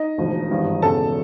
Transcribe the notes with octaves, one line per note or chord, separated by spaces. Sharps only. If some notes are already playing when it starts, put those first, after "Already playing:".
Already playing: D#4 D#5
E1 D2 D3 F3
G#1 G2 E3
E1 E2 C#3 A4 A5